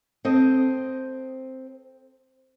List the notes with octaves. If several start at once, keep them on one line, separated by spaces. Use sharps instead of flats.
C4 A4 D#5